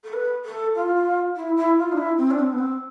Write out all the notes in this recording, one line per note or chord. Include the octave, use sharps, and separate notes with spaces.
A4
B4
A4
F4
E4
E4
F4
D4
E4
C4
D4
C4
B3
C4